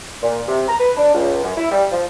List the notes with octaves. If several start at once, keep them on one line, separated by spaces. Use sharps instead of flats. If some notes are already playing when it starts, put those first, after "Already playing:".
A#2
C3
A#5
B4
D4
C#2
F#2
E4
G3
F3